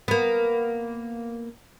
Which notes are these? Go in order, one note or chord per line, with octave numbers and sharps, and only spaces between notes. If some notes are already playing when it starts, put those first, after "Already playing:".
A#3 B3